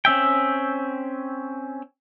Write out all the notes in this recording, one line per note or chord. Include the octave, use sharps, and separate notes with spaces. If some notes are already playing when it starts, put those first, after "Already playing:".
C4 C#4 E5 G5